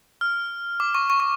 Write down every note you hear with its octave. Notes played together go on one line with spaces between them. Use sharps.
F6
D6
C#6
C#6
C#6